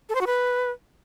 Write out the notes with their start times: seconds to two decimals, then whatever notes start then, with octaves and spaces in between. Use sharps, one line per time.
0.09 A4
0.15 C5
0.21 F#4
0.27 B4